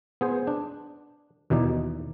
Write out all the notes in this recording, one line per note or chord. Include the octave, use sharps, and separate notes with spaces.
B3 G#4 C5
D4
D#2 B2 E3 D#4 D5